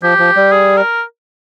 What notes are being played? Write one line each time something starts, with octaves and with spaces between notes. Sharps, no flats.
F3 G4
F3
G3
G#4
A#4